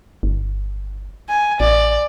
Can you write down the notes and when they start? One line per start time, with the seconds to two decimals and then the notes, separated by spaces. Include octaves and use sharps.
0.23 G1
1.29 G#5
1.60 A1 D5